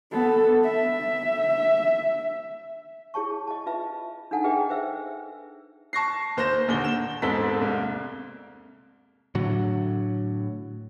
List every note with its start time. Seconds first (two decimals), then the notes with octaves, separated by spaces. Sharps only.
0.11 B3 A4
0.64 E5
3.14 E4 G#4 C#5 A5 C#6
3.47 D#5 A5
3.66 F4 B4 E5 A5
4.31 D4 D#4 A4 F#5 G#5
4.44 G#4 B4 D#5 E5 G5
4.70 B4 C5 E5 E6
5.93 A5 C#6 A#6 C7
6.37 D#2 C5 G6 A#6 E7
6.68 A#1 D#2 D3 G7
6.84 E7 G7
7.22 E1 G#2 C4 A4 B6
7.61 C2 A#3
9.35 A2 D3 F#3